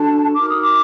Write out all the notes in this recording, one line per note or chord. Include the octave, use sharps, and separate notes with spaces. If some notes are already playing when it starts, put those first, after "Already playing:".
Already playing: D4 F#4 A4 A5
D#4 F#4 A#4 D6
D#6
D6